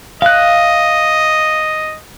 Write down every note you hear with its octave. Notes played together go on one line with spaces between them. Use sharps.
D#5 F5 F#6